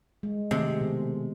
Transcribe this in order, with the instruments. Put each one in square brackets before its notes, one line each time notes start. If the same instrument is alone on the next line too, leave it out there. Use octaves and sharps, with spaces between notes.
[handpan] G#3
[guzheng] C3 G#3 [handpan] D#3 A3 C4
[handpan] B2